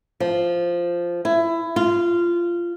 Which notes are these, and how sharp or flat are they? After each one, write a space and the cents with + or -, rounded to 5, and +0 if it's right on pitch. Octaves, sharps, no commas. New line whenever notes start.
F3 -5
E4 +20
F4 -15